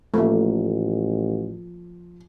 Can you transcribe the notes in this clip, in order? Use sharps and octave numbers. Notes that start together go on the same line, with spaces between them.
A1 F3 A3 A#3